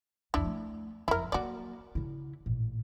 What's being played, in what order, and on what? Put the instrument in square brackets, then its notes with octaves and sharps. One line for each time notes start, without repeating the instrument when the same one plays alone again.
[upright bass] C2 F2 [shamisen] D4 E4
[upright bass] A3
[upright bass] F#1 F2 [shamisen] E4 A#4
[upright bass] F#3 A#3 [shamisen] F#4 D5
[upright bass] C#3 E4
A1 A#2